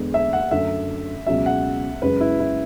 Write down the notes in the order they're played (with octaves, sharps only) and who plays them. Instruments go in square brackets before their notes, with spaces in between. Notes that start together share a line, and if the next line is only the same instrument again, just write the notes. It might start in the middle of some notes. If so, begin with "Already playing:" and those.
Already playing: [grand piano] E2 D3 G#3 B3
[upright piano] E5
F#5
[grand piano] F#2 D3 A3 C#4 [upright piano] E5
[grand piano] C#2 B2 F#3 C#4 [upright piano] E5
[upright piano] F#5
[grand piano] F#2 C#3 G#3 [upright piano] B4
[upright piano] E4
E4